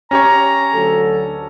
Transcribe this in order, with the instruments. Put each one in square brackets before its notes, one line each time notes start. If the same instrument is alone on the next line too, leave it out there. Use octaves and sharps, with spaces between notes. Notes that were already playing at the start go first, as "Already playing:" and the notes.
[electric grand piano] C#4 G4 C#5 [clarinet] A#5
[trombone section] D2 F#3 A4